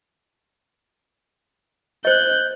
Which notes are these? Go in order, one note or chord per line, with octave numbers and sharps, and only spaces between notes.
C5 D#5 F#6 G6